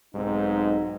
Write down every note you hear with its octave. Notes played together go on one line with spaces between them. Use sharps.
B1 G#2 C4 D#4